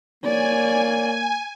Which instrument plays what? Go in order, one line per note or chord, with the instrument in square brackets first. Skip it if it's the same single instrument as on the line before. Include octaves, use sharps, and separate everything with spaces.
[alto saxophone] A#3 [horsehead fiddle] C#5 D5 [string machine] G#5